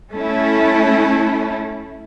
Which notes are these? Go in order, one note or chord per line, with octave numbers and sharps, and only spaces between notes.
A3 C#4 E4